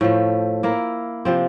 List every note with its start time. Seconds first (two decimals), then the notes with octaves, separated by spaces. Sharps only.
0.01 A2 F3 A3
0.63 A#3 E4 A#4
1.25 C3 F3 C4